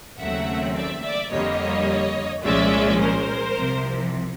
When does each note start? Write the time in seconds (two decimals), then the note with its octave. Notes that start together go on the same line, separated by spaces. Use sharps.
0.19 D#2 C#3 F#3 A3 C4 E5 F#5
0.75 D5 E5
1.03 D5 E5
1.32 F2 D3 G3 A#3 C#5 D#5
2.44 C2 A#2 F3 G#3 C#4 D5 E5
3.00 A#4 C5
3.56 C2 C3 F3